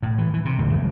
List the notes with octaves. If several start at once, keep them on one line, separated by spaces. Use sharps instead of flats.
A2
E3
E3
C3
D1 D2
F#1 C#3 F3 G#3